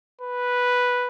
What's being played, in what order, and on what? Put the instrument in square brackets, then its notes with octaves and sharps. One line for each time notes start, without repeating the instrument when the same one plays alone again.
[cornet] B4